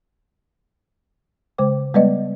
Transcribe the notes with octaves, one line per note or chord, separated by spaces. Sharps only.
C#3 G#3 C5 G5 D6
G3 G#3 B3 B4 D5 D#5